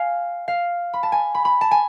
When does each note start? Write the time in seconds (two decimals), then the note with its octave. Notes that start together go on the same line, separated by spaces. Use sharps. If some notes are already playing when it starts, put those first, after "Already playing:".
Already playing: F5 G#5
0.48 F5
0.94 B5
1.03 A5
1.12 G#5
1.35 B5
1.45 B5
1.61 A5
1.71 G#5